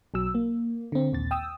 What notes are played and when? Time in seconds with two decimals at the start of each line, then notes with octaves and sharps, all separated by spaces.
0.14 B1 F#3 E6
0.35 A#3
0.92 D3 C4
1.12 A#1 D#2 A6
1.31 G5 D#6 E6